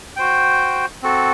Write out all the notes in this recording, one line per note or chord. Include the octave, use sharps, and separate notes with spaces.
F#4 C5 G5
C4 F#4 A4